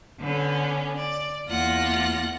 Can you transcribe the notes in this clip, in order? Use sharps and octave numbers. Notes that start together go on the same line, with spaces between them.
D3 B3 C#4
D5
E2 A#3 F4 F#5 A#6